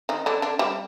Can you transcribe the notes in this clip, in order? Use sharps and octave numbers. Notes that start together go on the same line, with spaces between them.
D#3 D#4
D3 D4
D3 D4
G3 G4